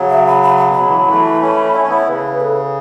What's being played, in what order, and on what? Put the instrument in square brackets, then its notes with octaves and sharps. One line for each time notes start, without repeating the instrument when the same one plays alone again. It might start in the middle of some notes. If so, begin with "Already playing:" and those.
Already playing: [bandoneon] C#3 F#3
[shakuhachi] E5
B5
B5
A5
[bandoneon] B2 [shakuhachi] B5
[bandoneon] C#3
E3
F#3
E3 A3
A3 C#4
[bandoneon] E4 [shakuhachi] C#5
[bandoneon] C#4
B3 E4
[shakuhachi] C#5
[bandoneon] C#3 [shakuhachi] B4
[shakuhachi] A4